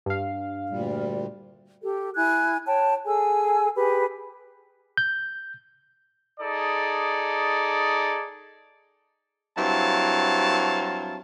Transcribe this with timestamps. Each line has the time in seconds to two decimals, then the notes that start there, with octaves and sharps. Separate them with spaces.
0.06 G2 F5
0.70 D2 A#2 G3
1.83 G4 A4
2.15 E4 G#5 F#6 G#6
2.66 C#5 G5 A5
3.05 G#4 A4 G#5 E6
3.75 G4 G#4 B4 B5
4.97 G6
6.40 D#4 G#4 A4 D5
9.58 G2 F#3 C4 E4 F5 A5